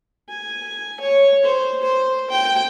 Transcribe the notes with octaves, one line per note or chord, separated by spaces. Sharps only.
G#5
C#5
C5
C5
G5